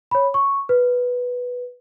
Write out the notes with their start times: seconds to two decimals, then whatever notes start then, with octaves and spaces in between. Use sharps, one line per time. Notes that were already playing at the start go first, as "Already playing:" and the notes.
0.11 C#5 B5
0.34 C#6
0.69 B4